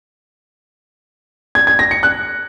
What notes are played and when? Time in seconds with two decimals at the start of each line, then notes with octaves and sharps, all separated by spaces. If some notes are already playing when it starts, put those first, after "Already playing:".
1.55 G#6
1.67 G#6
1.79 A#6
1.91 C#7
2.03 F#6